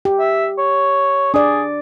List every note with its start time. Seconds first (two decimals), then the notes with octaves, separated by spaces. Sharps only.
0.05 G4
0.19 E5
0.58 C#5
1.34 D4 G#4 D5